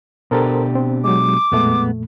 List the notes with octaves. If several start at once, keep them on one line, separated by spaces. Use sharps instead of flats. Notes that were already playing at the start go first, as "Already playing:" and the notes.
B2 D4 G4 A4 A#4 C5
C4
F#3 G#3 D6
F2 A#2 G#3 A3 B3